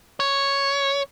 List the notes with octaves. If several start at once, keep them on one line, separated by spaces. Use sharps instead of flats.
C#5